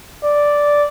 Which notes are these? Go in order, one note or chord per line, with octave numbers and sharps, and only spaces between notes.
D5